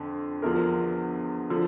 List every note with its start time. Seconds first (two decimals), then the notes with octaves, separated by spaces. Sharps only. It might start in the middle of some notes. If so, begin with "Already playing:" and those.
Already playing: F2 D3
0.42 E2 D3 F3 A#4
1.50 D3 F3